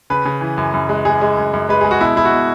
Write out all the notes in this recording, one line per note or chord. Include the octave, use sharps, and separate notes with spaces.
C#3 B4
C#3
E3
F#2
F#2
G#3
G#3 G#4
G#3
F#2
F#2
G#3 B4
G#3 G#4
F#4
B2 E4
B2 E4
F#4
B2